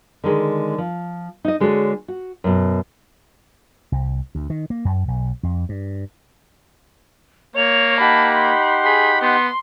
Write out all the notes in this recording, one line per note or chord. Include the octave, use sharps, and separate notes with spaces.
D3 D#3 G#3
F3
D#4 D#5
D3 G#3 F#4 A4 C#5
F#4
F#2 B2
C2
D2
D#3
A#3
F#2
B1
F2
G2
A#3 C#5 F7
D#4 G4 F#5 A5 B5
B5 C6
G#4 B5
B3 C6